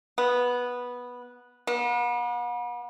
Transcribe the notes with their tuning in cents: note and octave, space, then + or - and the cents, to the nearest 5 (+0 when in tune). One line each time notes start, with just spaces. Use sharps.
B3 -10
B3 -40